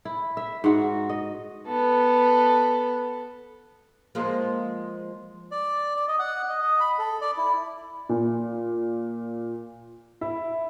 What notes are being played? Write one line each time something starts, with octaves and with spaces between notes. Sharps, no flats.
E4
E5
G#2 F#4
D#5
B3 A4
F3 G#3 A#3
D5
D5
D#5
F#5
D#5
D#5
B5
A4
D5
E4
A#2
E4